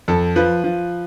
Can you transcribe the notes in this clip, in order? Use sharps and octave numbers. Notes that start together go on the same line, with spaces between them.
F2 A4
F3 B4
F3